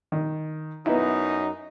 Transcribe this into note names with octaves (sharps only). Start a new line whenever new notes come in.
D#3
F#2 B3 D#4 E4